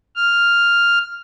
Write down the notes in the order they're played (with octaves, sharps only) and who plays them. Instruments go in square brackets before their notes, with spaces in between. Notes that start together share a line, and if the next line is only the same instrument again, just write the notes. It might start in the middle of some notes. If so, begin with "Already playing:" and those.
[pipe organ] F6